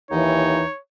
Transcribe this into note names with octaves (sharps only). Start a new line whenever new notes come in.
D#2 E3 D#4 C#5